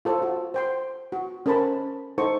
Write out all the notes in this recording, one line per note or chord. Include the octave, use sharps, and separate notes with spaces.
F4 A4 C5 C#5
F#4
C5 G5 C6
F#4
C#4 A4 A#4 C5 A5 B5
D#4 A4 C5 C#6